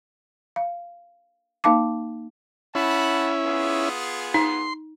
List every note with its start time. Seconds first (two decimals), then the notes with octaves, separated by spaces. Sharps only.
0.56 F5
1.64 A#3 D#4 F5 A5 D6
2.75 C#4 E4 F#5 A5 B5
3.45 B3 F4 G#4
4.34 D#4 C6